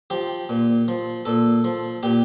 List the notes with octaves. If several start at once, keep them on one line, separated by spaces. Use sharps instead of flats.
F3 G4
A#2
F3
A#2 A4
F3
A#2 G4